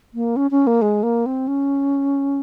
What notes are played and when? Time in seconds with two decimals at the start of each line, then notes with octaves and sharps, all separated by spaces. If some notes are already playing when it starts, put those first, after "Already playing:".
0.14 A#3
0.36 C#4
0.51 C#4
0.67 A#3
0.82 G#3
1.03 A#3
1.26 C4
1.48 C#4